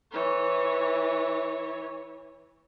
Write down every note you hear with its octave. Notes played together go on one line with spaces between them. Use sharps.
E3 C#5